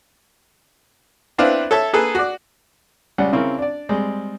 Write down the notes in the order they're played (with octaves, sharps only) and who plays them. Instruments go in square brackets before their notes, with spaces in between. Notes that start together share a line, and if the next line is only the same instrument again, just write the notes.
[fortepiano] B3 C4 D4 E4 B4 F5
A4 C#5 E5 A5
A#3 G#4 A4 B4
F#4 D5
C#2 G3 F#5
C#3 C4 C#4 E4 A#4
D4 D5
G3 G#3 C4